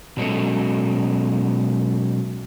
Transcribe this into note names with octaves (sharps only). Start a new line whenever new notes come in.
B2 F#3 G#3 A3 C#4 A4